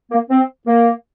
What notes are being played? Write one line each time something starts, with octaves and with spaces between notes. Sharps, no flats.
A#3
C4
A#3